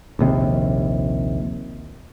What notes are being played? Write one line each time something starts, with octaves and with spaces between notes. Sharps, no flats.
A#1 D#2 C3